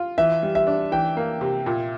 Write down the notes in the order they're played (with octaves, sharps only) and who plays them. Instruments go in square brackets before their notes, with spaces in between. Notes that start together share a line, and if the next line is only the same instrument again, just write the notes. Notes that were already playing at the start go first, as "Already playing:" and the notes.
Already playing: [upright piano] F4
[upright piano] E3 [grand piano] E5
[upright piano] G3
[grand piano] E5
[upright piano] D4
[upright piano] E3 [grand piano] G5
[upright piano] A#3
C3
A#2